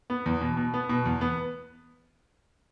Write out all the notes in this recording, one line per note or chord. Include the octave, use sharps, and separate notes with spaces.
B3
E2
B2
B2
B3
B2
E2
B3